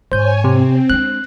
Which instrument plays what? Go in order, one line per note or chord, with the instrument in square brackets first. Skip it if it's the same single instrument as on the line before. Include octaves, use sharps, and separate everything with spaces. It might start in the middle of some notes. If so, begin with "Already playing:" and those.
[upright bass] G#2 [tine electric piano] C5 G6 [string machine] C#5 G#5
[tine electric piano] C3 [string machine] C4
[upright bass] G#3 D4 [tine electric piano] F#6